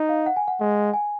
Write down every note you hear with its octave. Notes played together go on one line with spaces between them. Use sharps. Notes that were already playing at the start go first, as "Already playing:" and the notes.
Already playing: D#4
F5
F#5
G#5
F#5
G#3
G#5